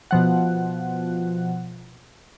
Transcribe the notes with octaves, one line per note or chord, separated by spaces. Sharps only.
B2 F3 F#5